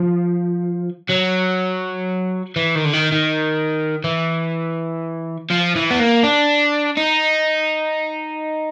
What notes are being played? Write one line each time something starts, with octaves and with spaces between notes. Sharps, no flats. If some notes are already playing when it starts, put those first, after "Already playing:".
Already playing: F3
F#3
E3
D#3
D3
D#3
D#3
E3
F3
E3
B3
A#3
D4
D#4